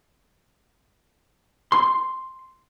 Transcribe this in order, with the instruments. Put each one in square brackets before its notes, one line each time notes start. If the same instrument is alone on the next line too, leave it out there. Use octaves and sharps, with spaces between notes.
[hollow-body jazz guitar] C6